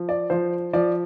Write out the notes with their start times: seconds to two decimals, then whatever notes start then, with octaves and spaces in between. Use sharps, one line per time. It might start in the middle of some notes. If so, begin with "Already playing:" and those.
Already playing: F3
0.09 D5
0.30 F3 C5
0.73 F3 D5